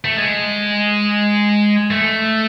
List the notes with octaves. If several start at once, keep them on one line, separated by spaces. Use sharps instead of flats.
A3
G#3
A3